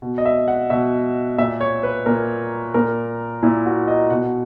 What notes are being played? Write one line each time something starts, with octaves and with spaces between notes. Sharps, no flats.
B2
D#5
E5
F#5
B2 E5
A#2 E5
C#5
B4
A#2 A#4
A#2 A#4
A#2 E4
F#4
D#5
B2 F#5